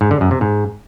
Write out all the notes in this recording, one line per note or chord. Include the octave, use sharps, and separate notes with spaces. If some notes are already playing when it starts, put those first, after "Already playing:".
G#2
D3
F#2
C3
G#2